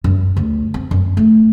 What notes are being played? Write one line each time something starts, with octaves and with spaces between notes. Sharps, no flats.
F#2
D2
C4
F#2
A3